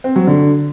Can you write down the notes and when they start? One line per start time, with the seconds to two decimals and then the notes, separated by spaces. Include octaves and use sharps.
0.04 C4
0.16 F#3
0.27 D3